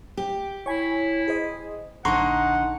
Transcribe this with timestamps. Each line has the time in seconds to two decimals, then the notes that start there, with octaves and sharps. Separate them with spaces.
0.17 G4
0.66 E4 C#5 G#5
1.28 G#4 C5 D#5
2.05 A#1 D3 D#4 F#5 A#5 C6 C#6